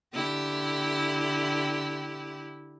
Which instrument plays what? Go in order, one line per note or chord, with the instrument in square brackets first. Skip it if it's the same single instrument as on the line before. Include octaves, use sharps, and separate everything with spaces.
[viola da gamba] D3 E4 G4